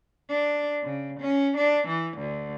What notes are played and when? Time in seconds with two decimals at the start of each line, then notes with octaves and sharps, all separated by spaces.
0.29 D4
0.83 C#3
1.20 C#4
1.58 D4
1.88 E3
2.18 D2